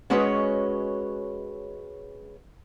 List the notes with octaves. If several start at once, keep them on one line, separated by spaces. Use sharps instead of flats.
G#3 C#4 F#4 B4 C#5 D#5